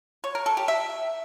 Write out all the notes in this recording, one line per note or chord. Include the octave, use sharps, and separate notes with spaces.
C#5
A#4
A4
G4
E5